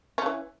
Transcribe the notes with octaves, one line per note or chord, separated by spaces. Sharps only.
C#3 E3 C#4